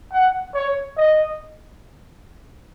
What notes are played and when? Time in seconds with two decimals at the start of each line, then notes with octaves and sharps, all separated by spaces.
0.12 F#5
0.54 C#5
0.97 D#5